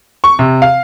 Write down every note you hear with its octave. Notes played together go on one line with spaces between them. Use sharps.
C#6
C3
F5